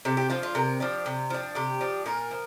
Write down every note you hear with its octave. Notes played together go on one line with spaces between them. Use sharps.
C3 G4
G4
F3 D4 F4
F4
C3 A#4
F3 D4 G4
C3
F3 D4
C3 G4
F3 D4
A#2 A#4
F3